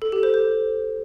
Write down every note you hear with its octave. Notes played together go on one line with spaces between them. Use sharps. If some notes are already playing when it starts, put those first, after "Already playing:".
A4
G4
C5
C5